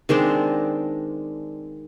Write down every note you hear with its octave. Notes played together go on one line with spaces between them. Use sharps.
D#3 G#3 C4 D4